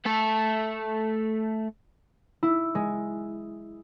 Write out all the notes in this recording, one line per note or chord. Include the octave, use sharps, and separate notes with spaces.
A3 A4
E4
G#3